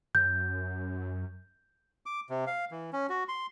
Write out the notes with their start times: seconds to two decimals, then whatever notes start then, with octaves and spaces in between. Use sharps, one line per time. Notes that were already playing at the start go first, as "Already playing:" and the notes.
0.15 F#2 G6
2.06 D6
2.30 C3
2.47 F5
2.72 E3
2.93 C#4
3.09 F#4
3.29 C6